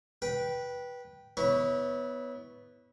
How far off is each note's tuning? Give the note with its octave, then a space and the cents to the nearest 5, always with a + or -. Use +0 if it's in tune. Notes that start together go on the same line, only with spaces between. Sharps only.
B4 -15 G5 -10
B3 +0 E4 -30 C#5 +0